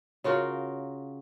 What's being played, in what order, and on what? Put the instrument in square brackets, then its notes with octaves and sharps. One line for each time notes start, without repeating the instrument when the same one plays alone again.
[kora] C#3 F4 F#4 A#4